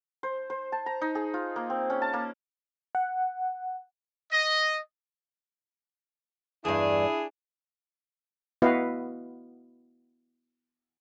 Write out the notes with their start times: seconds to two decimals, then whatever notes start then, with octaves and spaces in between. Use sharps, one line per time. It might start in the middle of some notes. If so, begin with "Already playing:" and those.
0.23 C5
0.50 C5
0.72 A5
0.86 A#5
1.01 D#4
1.15 G#4
1.34 F4
1.56 A#3
1.70 C4
1.90 C#4
2.02 A5
2.13 A#3
2.95 F#5
4.32 D#5
6.65 E2 G2 D4 E4 G#4
8.62 B3 E4 F#4 B4 D#5 F5